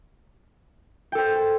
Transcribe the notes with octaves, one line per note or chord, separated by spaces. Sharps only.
A4 C5 G5